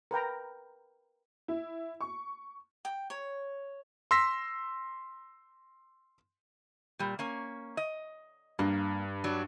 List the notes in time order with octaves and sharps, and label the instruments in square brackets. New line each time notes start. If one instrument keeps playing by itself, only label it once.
[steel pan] A#4 B4 G5 A#5
[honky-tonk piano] E4
C#6
[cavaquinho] G5
C#5
[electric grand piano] C6 E6 A#6 B6
[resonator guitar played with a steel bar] A#2 G3
A#3 C#4
D#5
[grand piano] G2 [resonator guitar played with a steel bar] A#3
[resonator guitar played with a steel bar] F#3 D4